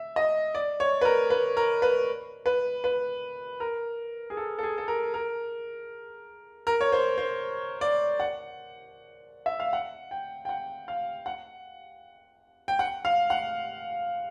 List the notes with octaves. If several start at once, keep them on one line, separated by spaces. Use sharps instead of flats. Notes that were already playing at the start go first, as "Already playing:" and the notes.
Already playing: E5
D#5
D5
C#5
B4
A#4
B4
A#4
B4
B4
B4
A#4
G#4
A4
A4
G#4
A4
A#4
A#4
A#4
C#5
C5
C5
D5
F#5
E5
F5
F#5
G5
G5
F#5
F5
F#5
G5
F#5
F5
F#5